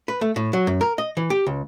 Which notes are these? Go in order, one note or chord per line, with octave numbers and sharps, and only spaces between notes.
B4
A3
A2
F#3
F#2
A#4
D#5
E3
G4
C#2